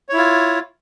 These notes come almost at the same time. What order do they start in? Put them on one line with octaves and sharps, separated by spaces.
C#5 E4 F4